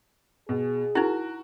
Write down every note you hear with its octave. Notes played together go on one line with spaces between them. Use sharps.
B2 G#4
D#4 E4 F#4 A#4